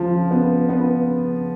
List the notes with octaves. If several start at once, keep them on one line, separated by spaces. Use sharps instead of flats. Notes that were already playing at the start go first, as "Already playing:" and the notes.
Already playing: C#2 F3
B3
B3